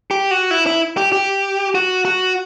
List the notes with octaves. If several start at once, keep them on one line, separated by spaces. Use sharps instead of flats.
G4
F#4
E4
E4
G4
G4
F#4
F#4